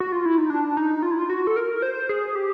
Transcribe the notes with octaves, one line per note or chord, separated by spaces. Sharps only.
F#4
F4
E4
D#4
D4
D#4
F4
E4
F4
F#4
A4
A#4
C5
G#4
G4